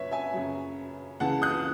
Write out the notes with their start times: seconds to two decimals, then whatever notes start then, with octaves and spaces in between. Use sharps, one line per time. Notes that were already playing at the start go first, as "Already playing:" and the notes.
Already playing: F#2 C#3 B4 C#5 E5
0.11 E5 G#5
0.34 F#2 C#3 F#3
1.20 C#2 C#3 E3 F#5 A5
1.42 D#6 F#6